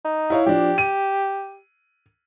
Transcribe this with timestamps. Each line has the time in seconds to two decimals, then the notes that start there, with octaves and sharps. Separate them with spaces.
0.05 D#4
0.30 E4 C#5 F5
0.46 F3 D4 G4
0.78 D#7